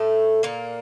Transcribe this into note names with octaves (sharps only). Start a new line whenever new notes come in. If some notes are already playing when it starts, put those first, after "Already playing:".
Already playing: A2 A3
A#2 A#3